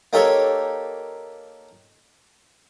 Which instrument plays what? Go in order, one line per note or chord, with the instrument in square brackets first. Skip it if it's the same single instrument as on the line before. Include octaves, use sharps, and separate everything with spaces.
[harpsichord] A#3 D#4 G4 A4 C#5